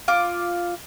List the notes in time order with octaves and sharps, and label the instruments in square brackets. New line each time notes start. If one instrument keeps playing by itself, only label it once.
[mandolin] F4 D6